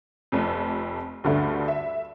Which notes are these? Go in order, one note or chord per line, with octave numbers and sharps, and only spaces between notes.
F1 F2
D2 G2 D3 A3
E5